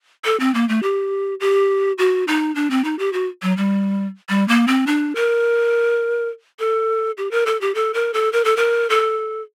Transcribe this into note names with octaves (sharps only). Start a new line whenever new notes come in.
A4
C4
A#3
A3
G4
G4
F#4
D#4
D4
C4
D#4
G4
F#4
F#3
G3
G3
A#3
C4
D4
A#4
A4
G4
A#4
A4
G4
A4
A#4
A4
A#4
A4
A#4
A4